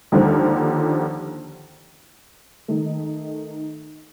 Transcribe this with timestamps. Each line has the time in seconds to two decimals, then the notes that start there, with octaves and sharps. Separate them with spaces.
0.12 D#2 D3 F3
2.68 D#3 A3 D#4